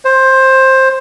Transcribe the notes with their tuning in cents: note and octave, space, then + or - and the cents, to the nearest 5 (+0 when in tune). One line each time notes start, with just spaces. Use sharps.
C5 +15